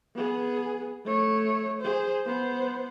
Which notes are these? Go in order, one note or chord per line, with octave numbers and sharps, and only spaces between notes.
B3 G#4
A3 C#5
G#4 C5
B3 C5